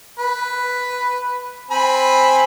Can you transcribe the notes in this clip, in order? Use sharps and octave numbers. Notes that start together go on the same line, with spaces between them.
B4
C4 G#5 B5